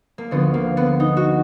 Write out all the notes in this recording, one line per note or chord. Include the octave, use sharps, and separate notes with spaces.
A#3
D2 D3 F3 B3
A#3
B3
D#4
F#4